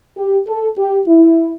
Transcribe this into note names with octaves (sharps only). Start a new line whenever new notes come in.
G4
A4
G4
E4